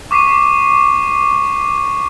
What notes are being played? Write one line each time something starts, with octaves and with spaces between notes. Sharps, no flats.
C#6 D6 B6 C7 D#7